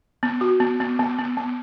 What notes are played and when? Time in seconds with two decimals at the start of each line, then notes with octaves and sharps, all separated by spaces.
0.23 B3
0.41 F#4
0.60 B3
0.80 B3
0.99 B3
1.19 B3
1.37 B3